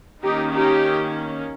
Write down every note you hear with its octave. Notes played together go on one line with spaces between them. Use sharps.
D#3 A#3 C#4 D#4 G4
D#4 G4